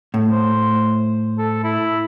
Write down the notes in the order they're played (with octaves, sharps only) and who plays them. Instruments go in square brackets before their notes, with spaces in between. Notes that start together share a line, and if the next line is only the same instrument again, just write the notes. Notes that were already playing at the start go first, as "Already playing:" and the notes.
[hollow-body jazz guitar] A2
[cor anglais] C5
A4
E4